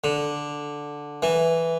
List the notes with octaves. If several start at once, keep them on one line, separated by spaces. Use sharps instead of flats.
D3
E3